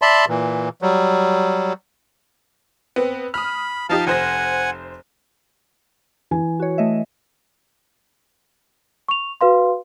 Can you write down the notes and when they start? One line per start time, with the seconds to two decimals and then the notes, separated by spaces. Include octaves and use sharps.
0.02 D5 E5 A5 B5 C6
0.28 A#2 E3
0.82 F#3 G3
2.96 B3 C4
3.34 B5 D#6 F6
3.89 F3 D#4 G4 F5 A5
4.07 F1 C5 F#5 G#5 A#6
6.31 E3 G#5
6.60 F#4 C#5
6.78 A3 D#5 E5
9.09 C#6 F7
9.41 F#4 B4 F5 C6